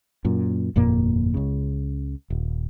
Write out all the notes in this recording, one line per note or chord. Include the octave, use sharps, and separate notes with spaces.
F#2 A#2
G1 F2 A#2 A#3
C#2 C#3
D#1